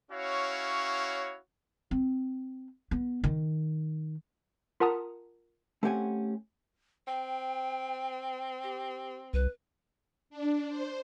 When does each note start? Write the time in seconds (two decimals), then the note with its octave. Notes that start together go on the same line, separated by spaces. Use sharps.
0.11 C#4 E4 F#4 C#5 F5
1.91 C4
2.91 B3
3.24 D#3
4.80 F4 A#4 F#5 A5 A#5 D#6
5.83 A3 C4 C#4 G4 F#5 G#5
7.07 C4 G5
8.63 G4
9.34 C2 B4
10.30 D4
10.69 C5